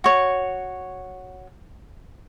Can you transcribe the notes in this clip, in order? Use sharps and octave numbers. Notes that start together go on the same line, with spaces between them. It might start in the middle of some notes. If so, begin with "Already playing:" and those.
F#4 C#5